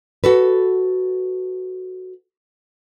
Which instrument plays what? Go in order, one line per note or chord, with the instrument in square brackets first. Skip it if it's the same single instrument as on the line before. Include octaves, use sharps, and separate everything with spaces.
[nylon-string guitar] F#4 A4 B4